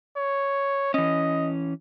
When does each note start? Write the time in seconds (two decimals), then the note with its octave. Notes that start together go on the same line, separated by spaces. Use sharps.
0.17 C#5
0.94 E3 C#4 D#5